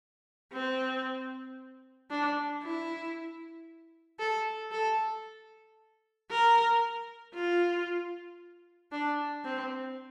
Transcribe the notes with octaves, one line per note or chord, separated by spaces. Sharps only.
C4
D4
E4
A4
A4
A#4
F4
D4
C4